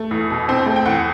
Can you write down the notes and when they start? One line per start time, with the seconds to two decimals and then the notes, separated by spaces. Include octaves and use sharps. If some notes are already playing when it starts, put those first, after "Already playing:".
Already playing: A3
0.11 E2
0.30 B2
0.49 C4
0.66 A3
0.76 G5
0.86 E2 F#5